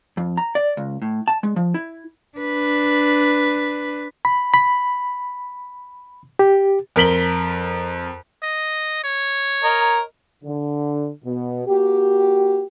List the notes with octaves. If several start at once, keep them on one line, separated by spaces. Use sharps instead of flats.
F2
A#5
D5
C#2
A2
A5
G#3
F3
E4
D4 B4
B5
B5
G4
F2 A#4 B6 F#7 G7
D#5
C#5
A#4 D#5
D3
B2
A#3 F#4 G4